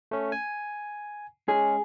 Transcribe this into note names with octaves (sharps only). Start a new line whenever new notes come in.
A3 C#4
G#5
G#3 C#4 G#4